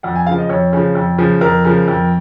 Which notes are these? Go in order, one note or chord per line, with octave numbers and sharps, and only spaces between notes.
F2 F#5
G#5
C#3 F3 F5
D#5
F2 C#5
C#3 F3
F2
C#3 F3
F2 A#4
C#3 F3
F2